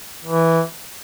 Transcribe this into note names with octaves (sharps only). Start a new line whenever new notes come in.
E3